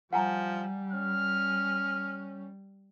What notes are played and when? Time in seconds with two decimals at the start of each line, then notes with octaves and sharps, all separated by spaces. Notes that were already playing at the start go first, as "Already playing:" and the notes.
0.13 F3 G3 F#5 G#5 A#5
0.92 C#4 F6